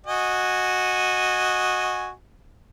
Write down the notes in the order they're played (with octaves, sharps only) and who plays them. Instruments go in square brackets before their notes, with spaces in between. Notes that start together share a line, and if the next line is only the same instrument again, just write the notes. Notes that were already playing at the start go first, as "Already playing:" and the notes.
[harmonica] F#4 D#5 G#5